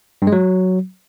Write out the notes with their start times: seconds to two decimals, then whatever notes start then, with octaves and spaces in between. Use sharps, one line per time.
0.22 G2
0.27 G#3
0.32 F#3